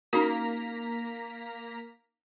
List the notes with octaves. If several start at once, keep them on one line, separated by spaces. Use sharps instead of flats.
A#3 C#4 D#4 F#4 A#5 B6